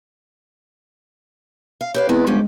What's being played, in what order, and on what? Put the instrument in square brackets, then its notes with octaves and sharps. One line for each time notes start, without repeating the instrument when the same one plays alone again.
[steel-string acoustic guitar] F5
[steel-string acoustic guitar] G4 B4 F5 [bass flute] C#5
[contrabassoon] E2 [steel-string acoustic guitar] G#3 B4 D5 [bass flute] C4
[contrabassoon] G1 [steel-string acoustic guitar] F3 C#4 G4 [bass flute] G#3